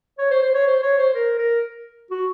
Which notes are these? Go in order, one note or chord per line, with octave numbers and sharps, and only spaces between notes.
C#5
C5
C5
C#5
C5
C#5
C5
A#4
A#4
F#4